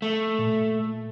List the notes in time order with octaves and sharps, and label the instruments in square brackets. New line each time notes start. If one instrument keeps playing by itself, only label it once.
[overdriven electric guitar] A3
[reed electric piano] A#2